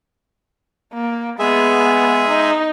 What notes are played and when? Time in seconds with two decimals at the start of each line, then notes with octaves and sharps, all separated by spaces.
0.93 A#3
1.39 G#3 B3 G#4 E5
2.29 D#4